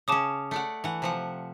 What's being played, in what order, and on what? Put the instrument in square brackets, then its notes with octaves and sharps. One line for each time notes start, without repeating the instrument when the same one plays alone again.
[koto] C#3 C#4 [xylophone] A5 D6 D#6
[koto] A3 D5 F#5
E3 F#5
C3 F3 F#5